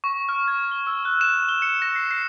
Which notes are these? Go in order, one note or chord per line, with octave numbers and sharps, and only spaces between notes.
C#6
F6
G#6
G7
E6
F#6
E7
G7
C#7
A#6
C7
C7